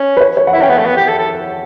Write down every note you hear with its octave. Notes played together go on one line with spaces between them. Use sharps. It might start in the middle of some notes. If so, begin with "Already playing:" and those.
Already playing: C#4
B4
C#5
C#5
F#5
E4 E5
C#4 G5
B3 F#5
A3
B3
G4
A4
A4